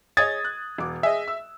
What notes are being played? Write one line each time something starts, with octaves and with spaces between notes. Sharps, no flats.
G#4 C#5 D#5 D#6 G#6 A6
F#6
E1 D6
G#4 D#5 E5
E6